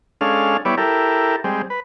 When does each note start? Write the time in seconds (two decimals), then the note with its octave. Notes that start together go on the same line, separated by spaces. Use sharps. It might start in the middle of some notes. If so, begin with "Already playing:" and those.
0.21 G#3 C#4 D4 A4 F5
0.65 G3 B3 E4 C#5 D5
0.77 E4 G4 A4 A#4
1.44 G3 G#3 C4
1.70 B4